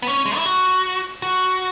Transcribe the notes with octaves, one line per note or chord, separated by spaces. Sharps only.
B3
C#4
G#3
E4
F#4
F#4